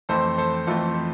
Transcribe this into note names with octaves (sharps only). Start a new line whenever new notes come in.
F2 E3 A3 C4 A4 C5
A4 C5
F2 E3 A3 C4 F4 A4